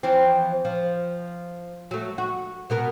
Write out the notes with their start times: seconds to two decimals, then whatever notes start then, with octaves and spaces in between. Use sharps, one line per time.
0.03 E3 F3 C4
0.65 F3
1.91 F#3 A3
2.18 F#4
2.70 B2 B3 A#4